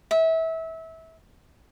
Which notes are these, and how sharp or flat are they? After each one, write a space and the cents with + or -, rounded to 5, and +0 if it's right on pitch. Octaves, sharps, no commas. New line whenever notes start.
E5 -25